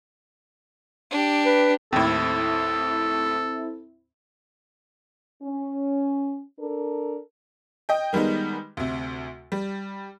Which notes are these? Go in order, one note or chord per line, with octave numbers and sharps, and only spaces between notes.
D4 G4
B4
D#2 A2 C4 E4 A4
C#4
D4 A4 A#4
D#5 G5
D#3 G3 G#3 B3 D#4
D2 C3
G3